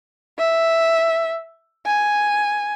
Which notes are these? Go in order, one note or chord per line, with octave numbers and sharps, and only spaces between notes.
E5
G#5